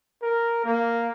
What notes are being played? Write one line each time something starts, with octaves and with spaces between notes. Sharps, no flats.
A#4
A#3